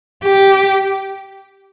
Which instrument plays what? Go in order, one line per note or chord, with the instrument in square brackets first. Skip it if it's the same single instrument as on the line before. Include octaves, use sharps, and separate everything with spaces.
[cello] G4